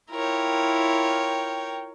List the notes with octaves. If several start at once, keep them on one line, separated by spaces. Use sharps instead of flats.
E4 F4 A#4 C#5 G5